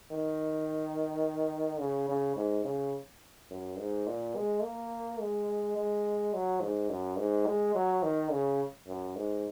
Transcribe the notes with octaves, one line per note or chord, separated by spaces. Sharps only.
D#3
C#3
C#3
G#2
C#3
F#2
G#2
A#2
G#3
A#3
G#3
G#3
F#3
G#2
F#2
G#2
G#3
F#3
D#3
C#3
F#2
G#2